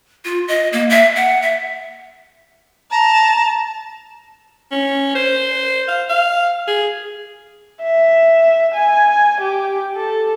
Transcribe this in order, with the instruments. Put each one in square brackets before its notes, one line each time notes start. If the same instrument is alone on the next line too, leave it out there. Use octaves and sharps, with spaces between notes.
[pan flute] F4
D#5
A#3
E5
F#5
E5
[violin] A5 [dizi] A#5
[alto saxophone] C#4
C5
F5
F5
G#4
[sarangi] E5
G#5
G4
A4